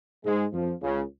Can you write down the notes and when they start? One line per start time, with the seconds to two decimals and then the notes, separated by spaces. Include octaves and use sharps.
0.24 G#2 G#3
0.53 F2 F3
0.82 C#2 C#3